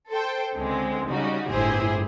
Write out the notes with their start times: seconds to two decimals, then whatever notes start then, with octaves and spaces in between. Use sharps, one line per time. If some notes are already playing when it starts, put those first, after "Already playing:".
0.11 A4 C5 G5
0.57 C#2 D3 G#3 C4
1.09 C#3 G3 D#4 F#4
1.50 G1 A2 E4 G4 G#4 C5